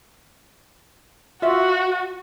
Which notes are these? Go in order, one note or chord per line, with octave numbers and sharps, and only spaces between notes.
F4 F#4 E5